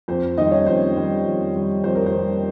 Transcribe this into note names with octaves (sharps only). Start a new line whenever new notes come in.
F2 C5
D#3 G3 D#4 D#5
C#4 C#5
F2 C5
D#3 G3
F2
D#3 G3
F2 C5
A#4
C5
D#3 G3